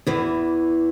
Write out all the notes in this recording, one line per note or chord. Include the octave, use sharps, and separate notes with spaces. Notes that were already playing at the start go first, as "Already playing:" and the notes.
E2 E3